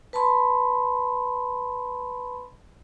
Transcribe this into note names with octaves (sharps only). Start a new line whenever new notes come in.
B4 A5 B5 C6